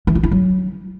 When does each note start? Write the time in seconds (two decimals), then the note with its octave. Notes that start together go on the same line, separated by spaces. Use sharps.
0.07 E3
0.15 F4
0.23 E4
0.31 F#3